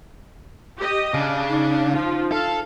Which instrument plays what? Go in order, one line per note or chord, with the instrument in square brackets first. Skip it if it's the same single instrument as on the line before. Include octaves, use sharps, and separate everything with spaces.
[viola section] G4 D#5
[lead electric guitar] C#3 [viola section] D4
[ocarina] D#4
[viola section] F3 F4
[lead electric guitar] A4 [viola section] F5